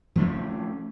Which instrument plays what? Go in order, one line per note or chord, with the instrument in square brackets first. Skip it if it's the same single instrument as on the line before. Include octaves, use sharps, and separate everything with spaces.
[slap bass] F3 A3 C#4